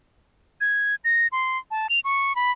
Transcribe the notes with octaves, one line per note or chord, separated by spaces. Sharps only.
G#6
A#6
C6
A5
F7
C#6
B5